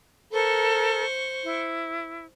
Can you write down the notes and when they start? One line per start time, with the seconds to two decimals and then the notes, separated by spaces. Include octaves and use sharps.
0.33 A4 A#4 C5 C#6
1.45 E4